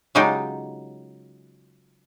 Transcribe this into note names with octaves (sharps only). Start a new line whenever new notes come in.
C#3 F#3 G#3 D#4 F4 G4